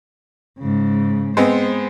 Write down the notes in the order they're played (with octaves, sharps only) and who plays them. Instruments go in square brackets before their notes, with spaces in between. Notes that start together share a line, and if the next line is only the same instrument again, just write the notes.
[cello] G#2 C#3
[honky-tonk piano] G#3 B3 C4 [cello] C5